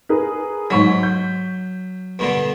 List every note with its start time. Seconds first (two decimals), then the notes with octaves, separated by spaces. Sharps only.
0.09 G#4 A#4 B4
0.70 G#2 F#3 C#6 B6
1.03 G6
2.19 G2 B2 D3